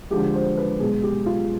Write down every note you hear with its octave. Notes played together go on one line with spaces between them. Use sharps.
D3 F3 G#3 G4
C5
B4
B2 G#3 G#4
G4
F4